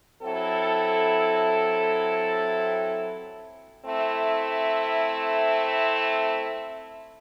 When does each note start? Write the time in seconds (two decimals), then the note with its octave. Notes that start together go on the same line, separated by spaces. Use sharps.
0.22 F#3 C4 E4 A4
3.84 A3 C4 E4